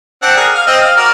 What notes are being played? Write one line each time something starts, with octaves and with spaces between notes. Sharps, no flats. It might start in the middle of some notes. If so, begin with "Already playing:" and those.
C4 D4 F#5
G#4 A#4
F5 F6
C4 D#5 E6
F5
F#4 A#4 D5